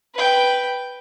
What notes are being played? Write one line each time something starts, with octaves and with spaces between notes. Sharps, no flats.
B4 G5